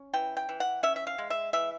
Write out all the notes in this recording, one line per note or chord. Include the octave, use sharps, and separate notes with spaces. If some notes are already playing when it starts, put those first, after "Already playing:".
Already playing: C#4
E3 G5
G5
E3
F#5
C#4 E5
E5
F5
G#3
E5
E3 E5